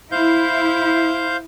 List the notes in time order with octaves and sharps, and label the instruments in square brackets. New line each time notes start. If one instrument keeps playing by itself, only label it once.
[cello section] E4 [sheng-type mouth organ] C5 F5 G6